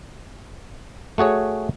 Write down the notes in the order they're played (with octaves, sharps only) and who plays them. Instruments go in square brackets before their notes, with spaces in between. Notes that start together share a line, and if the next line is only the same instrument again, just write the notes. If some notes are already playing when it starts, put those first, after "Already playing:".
[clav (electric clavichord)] A3 F#4 G#4 C#5